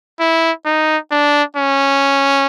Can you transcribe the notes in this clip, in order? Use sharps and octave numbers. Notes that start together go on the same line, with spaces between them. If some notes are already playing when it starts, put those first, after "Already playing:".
E4
D#4
D4
C#4